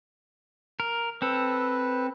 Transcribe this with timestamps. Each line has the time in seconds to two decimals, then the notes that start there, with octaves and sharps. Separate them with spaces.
0.80 A#4
1.22 C4 A4 B4